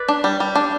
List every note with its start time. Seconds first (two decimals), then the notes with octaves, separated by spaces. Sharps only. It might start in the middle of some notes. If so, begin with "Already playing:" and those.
Already playing: B4 D5
0.08 D4
0.24 G3
0.40 G3
0.55 D4